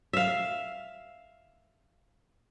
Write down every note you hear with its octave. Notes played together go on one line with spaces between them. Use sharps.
E5 F5